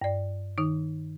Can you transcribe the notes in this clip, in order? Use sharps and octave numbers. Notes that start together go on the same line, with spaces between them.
G2 D5
D#3 D#4